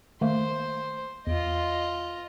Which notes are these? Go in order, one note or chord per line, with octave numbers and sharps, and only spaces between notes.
D#3 A3 A#3 C5
E2 F4 D#5